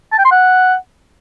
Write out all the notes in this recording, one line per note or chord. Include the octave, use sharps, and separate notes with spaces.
A5
G5
C6
F#5